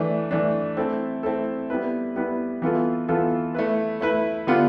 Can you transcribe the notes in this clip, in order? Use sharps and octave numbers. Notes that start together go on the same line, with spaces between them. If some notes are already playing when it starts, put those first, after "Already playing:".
Already playing: E3 A3 D4
E3 A3 D4
A3 C4 E4 A4
A3 C4 E4 A4
G3 B3 E4 B4
G3 B3 E4 B4
E3 B3 F4 A4
E3 B3 F4 A4
A3 E4 B4
A3 E4 B4
D3 G3 B3 F4